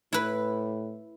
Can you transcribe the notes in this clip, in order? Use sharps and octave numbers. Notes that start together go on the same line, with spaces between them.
A2 E4 B4